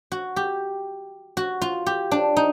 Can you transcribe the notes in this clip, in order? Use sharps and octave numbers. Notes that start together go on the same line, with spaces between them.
F#4
G4
F#4
F4
G4
D4
D#4